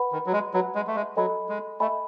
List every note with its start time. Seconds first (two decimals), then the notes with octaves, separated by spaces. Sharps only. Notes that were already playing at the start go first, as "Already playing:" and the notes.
Already playing: B4 F#5 B5
0.12 D#3
0.26 F#3
0.33 G#3
0.54 F#3 B4 F#5 B5
0.75 G#3
0.87 A3
0.96 G#3
1.17 F#3 A4 D#5 G#5 B5
1.49 G#3
1.80 A3 A4 D#5 G#5 B5